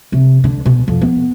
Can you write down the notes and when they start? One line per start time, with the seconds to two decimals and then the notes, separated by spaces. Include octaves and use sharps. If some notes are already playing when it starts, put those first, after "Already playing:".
0.12 C3
0.44 D3
0.66 B2
0.88 F2
1.02 B3